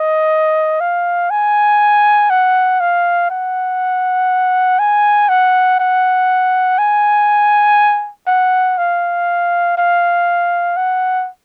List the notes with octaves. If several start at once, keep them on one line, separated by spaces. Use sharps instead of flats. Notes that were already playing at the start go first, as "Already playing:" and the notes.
Already playing: D#5
F5
G#5
F#5
F5
F#5
G#5
F#5
F#5
G#5
F#5
F5
F5
F#5